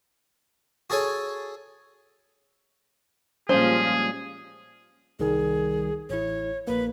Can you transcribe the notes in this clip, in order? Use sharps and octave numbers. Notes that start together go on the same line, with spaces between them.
F#4 G#4 A4 C#5 G#5
A#2 F3 G3 G#3 C#4 F4 G#4 C5
C2 D#3 G3 G#4
A1 E4 C#5
A#1 A#3 B4